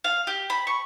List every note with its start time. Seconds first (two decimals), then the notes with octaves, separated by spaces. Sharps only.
0.04 F5
0.27 G4
0.50 B5
0.67 C#6